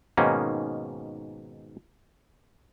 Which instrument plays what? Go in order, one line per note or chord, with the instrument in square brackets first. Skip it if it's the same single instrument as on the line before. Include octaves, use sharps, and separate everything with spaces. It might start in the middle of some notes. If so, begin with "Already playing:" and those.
[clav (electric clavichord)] G#2 B2 D#3 A#3 C#4